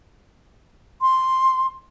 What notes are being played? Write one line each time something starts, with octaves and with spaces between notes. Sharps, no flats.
C6